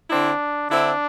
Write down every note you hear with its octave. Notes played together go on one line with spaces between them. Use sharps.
D3 C4 D4 E4
D3 C4 D4 E4